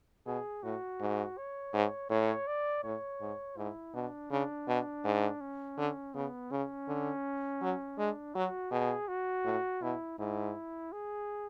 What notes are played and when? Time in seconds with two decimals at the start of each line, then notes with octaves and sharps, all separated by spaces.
0.27 B2 G#4
0.63 A2 F#4
1.00 G#2
1.37 C#5
1.74 G#2
2.10 A2 C#5
2.47 D5
2.83 A2 C#5
3.21 G#2
3.57 G#2 E4
3.95 B2 D4
4.31 C#3 D4
4.68 B2
5.05 G#2
5.41 C#4
5.78 D3
6.14 C#3 B3
6.51 C#3 C#4
6.88 D3
7.62 F#3
7.98 G#3 D4
8.35 F#3 F#4
8.71 B2 G#4
9.08 F#4
9.45 A2
9.82 B2 E4
10.19 G#2 E4
10.92 G#4